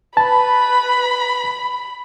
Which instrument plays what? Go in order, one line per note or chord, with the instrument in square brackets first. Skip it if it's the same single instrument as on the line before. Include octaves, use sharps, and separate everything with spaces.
[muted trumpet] B4 [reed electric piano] A5 [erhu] B5